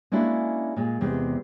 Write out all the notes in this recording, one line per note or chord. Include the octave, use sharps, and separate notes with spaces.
G#3 A#3 C#4 D4 E4 F#4
A#2 G#3
E2 C3 G#3